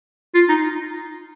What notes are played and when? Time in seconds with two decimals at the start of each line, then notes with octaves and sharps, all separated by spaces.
0.35 F4
0.49 D#4